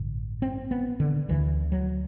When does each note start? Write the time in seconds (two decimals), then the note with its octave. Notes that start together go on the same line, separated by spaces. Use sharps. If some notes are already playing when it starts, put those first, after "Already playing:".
Already playing: A1 G2 D3
0.42 C4
0.71 B3
1.00 D3
1.29 D2 D3 E3
1.72 F#3